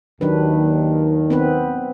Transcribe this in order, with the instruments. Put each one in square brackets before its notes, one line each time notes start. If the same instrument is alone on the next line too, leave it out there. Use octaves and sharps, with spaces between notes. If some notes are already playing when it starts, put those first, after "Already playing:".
[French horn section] D#2 D#3 [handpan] F#3 D4 B4
[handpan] B3 C4 B4